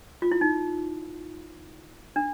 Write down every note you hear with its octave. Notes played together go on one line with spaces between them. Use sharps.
F4
E4
D#4
D4